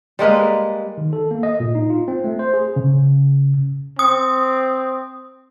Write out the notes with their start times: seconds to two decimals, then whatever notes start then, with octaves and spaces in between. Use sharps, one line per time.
0.19 G3 G#3 A#3 B4
0.98 D#3
1.13 A4
1.31 A#3
1.43 D#5
1.60 A#2
1.75 D#4
1.90 F4
2.08 C4
2.24 A3
2.39 C5
2.54 G#4
2.76 C#3
3.99 C4 D#6